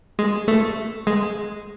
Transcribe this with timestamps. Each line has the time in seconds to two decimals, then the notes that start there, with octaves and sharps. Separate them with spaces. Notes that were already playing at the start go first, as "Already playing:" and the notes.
0.19 G#3
0.48 A3
1.07 G#3